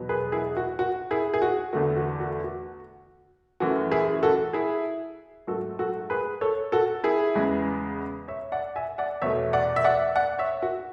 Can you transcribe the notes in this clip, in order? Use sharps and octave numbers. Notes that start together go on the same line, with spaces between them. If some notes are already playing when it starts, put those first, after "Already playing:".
Already playing: E2 B2 F#3 B3
G#4 B4
E4 G#4
F#4
F#4
E4 G#4
G#4
F#4
E2 D3 A3 F#4
F#4
F#4
F#4
F#2 E3 A3 F#4
E4 G#4
F#4 A4
E4 G#4
G#2 F#3 A3 F#4 A4
F#4 A4
G#4 B4
A4 C#5
F#4 A4
E4 G#4
E2 C#3 G#3 B3
C#5 E5
D5 F#5
E5 G#5
D5 F#5
E2 B2 A3 C#5 E5
D5 F#5
E5
D5 F#5
D5 F#5
C#5 E5
F#4